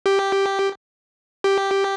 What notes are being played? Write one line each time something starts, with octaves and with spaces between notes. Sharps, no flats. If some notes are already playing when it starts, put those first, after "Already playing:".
G4
G4